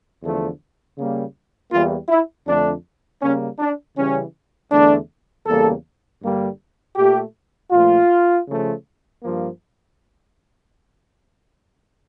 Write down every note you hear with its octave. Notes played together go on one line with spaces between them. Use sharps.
E2 D3 F3 A3
C#3 G3 A#3
E2 E3 G3 A#3 F4
E4
F2 D3 A3 D4
C#3 G3 A#3 C#4
D4
C#3 E3 G3 C#4
E2 D3 A3 D4
E2 C#3 G3 A#3 A4
G2 D3 G3 A#3
A#2 A3 G4
A#2 F3 A3 F4
C#3 F3 A3
G2 F3 A#3